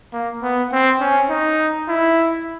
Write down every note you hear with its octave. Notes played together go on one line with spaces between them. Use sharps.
A#3
B3
C4
C#4
D#4
E4